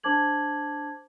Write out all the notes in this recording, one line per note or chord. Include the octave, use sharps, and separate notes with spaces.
D4 C5 A5 D6 G#6 F#7